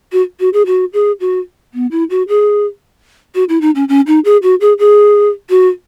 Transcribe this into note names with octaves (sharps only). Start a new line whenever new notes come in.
F#4
F#4
G#4
F#4
G#4
F#4
B3
E4
F#4
G#4
F#4
E4
D#4
C#4
C#4
D#4
G#4
F#4
G#4
G#4
F#4